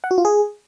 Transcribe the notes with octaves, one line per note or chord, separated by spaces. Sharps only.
F#5
F#4
F4
G#4